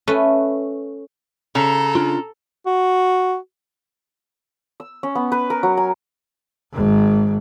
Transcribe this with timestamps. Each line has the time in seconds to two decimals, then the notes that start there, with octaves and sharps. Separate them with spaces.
0.08 A3 C#4 B4
1.55 C#3 A4 A#5
1.95 C#4 D4 F4
2.66 F#4
4.80 E6
5.03 C#4
5.15 B3
5.32 B4
5.50 A#4
5.63 F#3
5.77 G#5
6.72 G#1 G#2